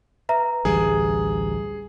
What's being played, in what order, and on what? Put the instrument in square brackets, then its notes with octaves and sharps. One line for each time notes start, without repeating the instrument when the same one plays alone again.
[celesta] B4 E5 A#5
[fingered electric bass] A1 D2 G3 [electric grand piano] G#4